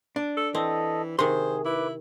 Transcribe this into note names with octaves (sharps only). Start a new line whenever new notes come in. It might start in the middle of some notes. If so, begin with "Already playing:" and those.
D4
A4
E3 C4 A4 D#5
C3 D#3 G#4 C5 C6
E4 B4 D6